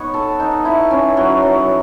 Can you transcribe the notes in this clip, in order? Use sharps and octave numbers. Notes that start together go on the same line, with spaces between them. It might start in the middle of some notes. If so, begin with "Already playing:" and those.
Already playing: B3 D#4 C#5
A4
D#4
E4
C#4
F#3
F#3